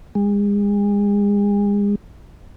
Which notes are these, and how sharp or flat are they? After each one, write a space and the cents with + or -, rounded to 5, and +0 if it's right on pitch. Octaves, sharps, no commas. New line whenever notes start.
G#3 -35